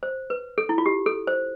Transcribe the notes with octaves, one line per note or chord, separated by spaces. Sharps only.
C5
B4
A4
E4
F4
G4
A4
C5